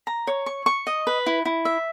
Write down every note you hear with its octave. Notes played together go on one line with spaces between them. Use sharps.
A#5
C#5
C#6
C#6
D#5
B4
E4
E4
E5